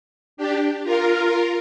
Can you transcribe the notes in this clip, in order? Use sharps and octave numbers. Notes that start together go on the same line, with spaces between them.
D4 G4
F4 A#4